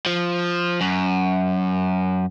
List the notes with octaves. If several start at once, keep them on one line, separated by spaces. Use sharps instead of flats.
F3
F#2